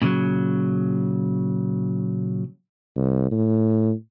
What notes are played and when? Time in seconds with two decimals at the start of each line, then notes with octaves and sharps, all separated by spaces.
0.02 A#2 C#3 F3 F#3
2.96 C2
3.31 A2